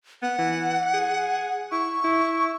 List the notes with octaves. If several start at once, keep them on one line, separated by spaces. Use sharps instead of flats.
B3 F#5
E3
G#4
E4 C#6
E4